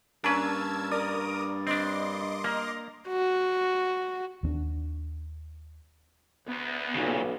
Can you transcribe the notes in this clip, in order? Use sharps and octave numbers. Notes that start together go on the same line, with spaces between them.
G2 A#3 C#4 D4 B4 A5 E6 G#6
A#4 D5 D#6
C4 D4 D#5 C6 D6
A#3 A#5
F#4
D#2 B3 D4
D2 B3
B1 A#2 C#3